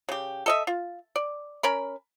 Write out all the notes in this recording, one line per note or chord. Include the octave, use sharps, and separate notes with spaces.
C#3 G4
A4 D#5 E5
F4
D5
C#4 A#4 B5